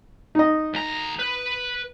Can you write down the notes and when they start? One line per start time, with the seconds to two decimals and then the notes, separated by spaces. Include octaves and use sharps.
0.35 D#4 D#5
0.74 D2 A#5
1.19 B4